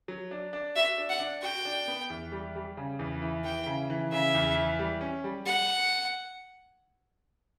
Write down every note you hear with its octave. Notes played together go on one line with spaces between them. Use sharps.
F#3
D4
D4
F#4 E5
D4
F#5
D4
F#4 G5
D4
B3
E2
G3
G3
C#3
E2
E3
E3 G5
C#3
E3
C#3 E5
E2
E3
G3
C#4
G3
G3 F#5